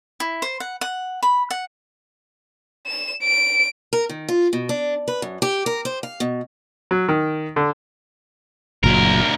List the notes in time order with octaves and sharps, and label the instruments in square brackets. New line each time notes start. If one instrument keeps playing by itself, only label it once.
[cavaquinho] E4
C5
F#5
F#5
B5
F#5
[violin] E7
D7
[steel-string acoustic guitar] A#4
D#3
F4
B2
D4
B4
F#2
G4
A#4
C5
F5
B2
[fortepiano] F#3
D#3
D3
[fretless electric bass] F#1 A#2 F#3 [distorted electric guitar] D2 A#4